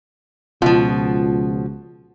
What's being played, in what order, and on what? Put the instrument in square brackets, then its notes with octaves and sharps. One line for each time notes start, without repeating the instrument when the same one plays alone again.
[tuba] C#2 [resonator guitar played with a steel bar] B2 F3 [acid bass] F4